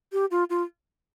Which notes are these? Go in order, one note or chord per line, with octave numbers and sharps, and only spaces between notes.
G4
F4
F4